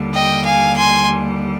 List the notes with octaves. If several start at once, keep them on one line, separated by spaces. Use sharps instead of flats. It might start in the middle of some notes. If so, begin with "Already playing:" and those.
Already playing: D#2 D3 G3
D#5 G5
F5 G#5
G#5 C6